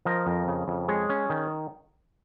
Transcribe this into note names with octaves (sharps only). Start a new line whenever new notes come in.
F3 A#4 D#5
F2
C#3
F2
G#3 G#4 C#5
C#4
D#3